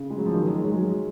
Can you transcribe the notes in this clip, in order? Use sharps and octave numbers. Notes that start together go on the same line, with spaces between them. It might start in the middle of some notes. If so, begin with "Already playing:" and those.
Already playing: C#3
G#3
F#3
F3
D#3
F#3
G#3
F#3
G#3
F#3